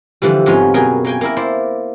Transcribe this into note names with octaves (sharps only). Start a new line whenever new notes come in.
D3 E3 F3 G3
F2 G#2 G#3 B3 C#4 F4
F#2 B2 G#4 A#4 G5 G#5
A#3 G5 G#5
A#3 E4 A#4
E4 C5 D5